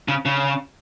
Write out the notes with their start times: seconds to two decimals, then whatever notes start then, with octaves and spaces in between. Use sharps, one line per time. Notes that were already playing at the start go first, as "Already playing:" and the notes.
0.08 C#3
0.25 C#3